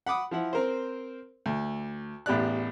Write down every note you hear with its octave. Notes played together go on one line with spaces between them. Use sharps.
F#5 B5 D6 D#6
F3 E4 F#5
C4 A#4 C5
D2
A1 E2 G4 D5 F#6